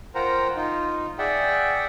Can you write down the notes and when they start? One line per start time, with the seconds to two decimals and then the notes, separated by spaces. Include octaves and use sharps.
0.15 F4 A#4 C5 F#5 G5 A#5
0.56 D#4 F4
1.18 G#4 D5 E5 F#5 G5